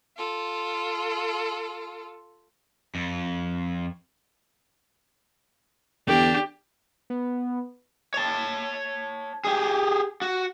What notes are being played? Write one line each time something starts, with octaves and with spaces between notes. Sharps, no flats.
F4 A4
F2
E2 D3 D4 G4
B3
C#5 A5
G4 G#4
F#4